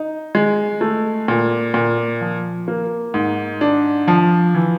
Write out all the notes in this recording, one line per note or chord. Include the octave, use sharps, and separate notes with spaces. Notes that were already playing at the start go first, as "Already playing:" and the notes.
Already playing: D#4
G#3
A3
A#2
A#2
F3
A#3
G#2
D4
F3
E3